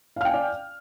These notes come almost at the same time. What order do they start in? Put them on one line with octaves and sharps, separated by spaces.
F5 F6 G5 G#5 D5